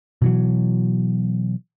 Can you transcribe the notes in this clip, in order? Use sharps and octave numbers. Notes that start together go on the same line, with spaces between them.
B2 E3 F#3